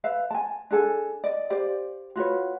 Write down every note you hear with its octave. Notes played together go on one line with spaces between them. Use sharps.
B4 E5 F5
G#5 A5
D4 G#4 A4 G#5
D5 D#5
G4 C5 D5 F5
F4 F#4 B4 C#5